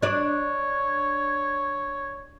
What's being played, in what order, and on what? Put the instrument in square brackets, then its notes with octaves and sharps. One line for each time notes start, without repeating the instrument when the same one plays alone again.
[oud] D4 D5 [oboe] C#5